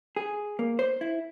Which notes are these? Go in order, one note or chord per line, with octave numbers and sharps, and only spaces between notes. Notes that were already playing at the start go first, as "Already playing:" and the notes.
G#4
A#3
C5
E4